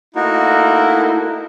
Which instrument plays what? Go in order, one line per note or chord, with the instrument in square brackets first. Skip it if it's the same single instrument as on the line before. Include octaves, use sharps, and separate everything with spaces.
[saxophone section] A3 A#3 E4 [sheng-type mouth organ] D#4 F#4